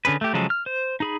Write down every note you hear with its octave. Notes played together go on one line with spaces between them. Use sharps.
D3 C#4 G#4 B4
A3 G4
C#3 F3 F#3 G#3 A4
F6
C5
D#4 G#4 B5